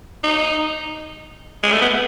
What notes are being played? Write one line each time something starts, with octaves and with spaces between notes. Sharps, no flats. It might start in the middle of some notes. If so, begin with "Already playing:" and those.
D#4
G#3
A3
B3